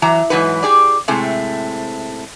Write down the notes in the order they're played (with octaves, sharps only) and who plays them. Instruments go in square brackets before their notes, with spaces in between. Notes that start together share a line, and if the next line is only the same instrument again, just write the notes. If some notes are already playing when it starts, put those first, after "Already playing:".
[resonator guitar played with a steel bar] E3 F#3 A#5
G#2 E3 F#3 B4
G4 G#4 D5
A2 C3 G#3 A3 C4